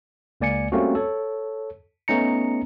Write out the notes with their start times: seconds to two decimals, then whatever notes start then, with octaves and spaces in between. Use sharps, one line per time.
0.41 C#2 A#3 D5 G#5 C#7
0.72 G3 A3 A#3 C4 C#4 F#4
0.95 A4 C#5
2.08 A3 B3 C#4 D#4 A#5 C#7